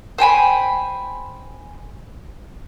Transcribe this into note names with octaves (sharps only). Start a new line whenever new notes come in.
C5 G5 G#5 B5